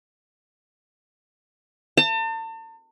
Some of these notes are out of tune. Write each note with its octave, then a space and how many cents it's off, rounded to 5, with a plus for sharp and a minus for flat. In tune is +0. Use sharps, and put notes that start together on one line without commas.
A5 +40